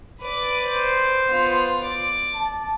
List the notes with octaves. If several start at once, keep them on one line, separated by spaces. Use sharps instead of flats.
B4 D5
C5
B3 F4
D5
A5